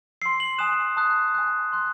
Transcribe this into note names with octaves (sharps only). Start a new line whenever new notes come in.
C6 E6 C7
F#7
G#5 D#6 F#6 E7
A5 D#6 F#6
G#5 D#6 F#6
C6 F#6